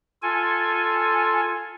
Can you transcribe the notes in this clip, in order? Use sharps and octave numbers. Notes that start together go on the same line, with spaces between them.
F4 A4 G#5